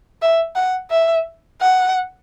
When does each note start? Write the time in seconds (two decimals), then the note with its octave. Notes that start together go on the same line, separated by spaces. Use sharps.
0.22 E5
0.56 F#5
0.90 E5
1.60 F#5